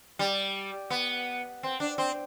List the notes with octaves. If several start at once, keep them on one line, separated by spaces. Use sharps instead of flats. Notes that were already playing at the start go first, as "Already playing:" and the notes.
G3
B3
C4
D4
C4